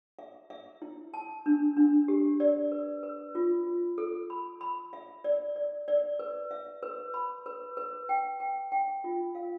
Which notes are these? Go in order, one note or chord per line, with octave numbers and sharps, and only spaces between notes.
E5
E5
E4
A5
D4
D4
G4
D5
B4
B4
F4
F4
A4
B5
B5
E5
D5
D5
D5
B4
E5
B4
B5
B4
B4
G5
G5
G5
F4
F5